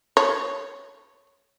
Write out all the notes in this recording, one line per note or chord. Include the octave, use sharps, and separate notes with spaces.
C#5